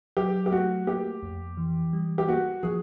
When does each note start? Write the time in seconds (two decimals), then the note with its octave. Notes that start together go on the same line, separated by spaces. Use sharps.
0.17 F#3 G4
0.46 G4
0.52 A3 F#4
0.87 A#3 G4
1.23 F2
1.57 E3
1.93 G3
2.18 G4
2.27 A#3 F#4
2.63 F3 G#4